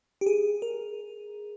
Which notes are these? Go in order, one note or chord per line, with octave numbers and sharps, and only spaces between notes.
G4
G#4
A#4